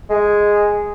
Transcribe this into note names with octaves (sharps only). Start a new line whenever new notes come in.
G#3